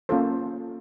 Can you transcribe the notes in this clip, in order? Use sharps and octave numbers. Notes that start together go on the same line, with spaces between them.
A#3 C#4 F4 A4 C5